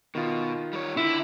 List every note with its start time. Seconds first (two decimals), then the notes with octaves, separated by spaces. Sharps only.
0.15 B2 D#3 F4
0.73 G3 C#5
0.97 D3 E4